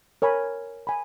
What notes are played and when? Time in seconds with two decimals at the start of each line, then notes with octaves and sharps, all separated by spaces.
0.22 A#4 C#5 G#5 B5
0.87 G#5 B5